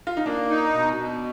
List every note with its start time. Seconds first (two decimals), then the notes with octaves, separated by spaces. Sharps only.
0.07 F4
0.17 D#4
0.25 A#3 D4
0.49 D#4
0.73 B2
0.96 B2